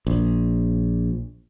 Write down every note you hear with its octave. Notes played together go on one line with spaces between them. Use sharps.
A#1